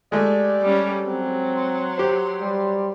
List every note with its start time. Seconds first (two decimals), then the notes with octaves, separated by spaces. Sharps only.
0.12 G#3 A3 G4 D5
0.62 G3 C#4
1.06 F#3 C4
1.55 C6
1.98 G4 C5
2.41 G3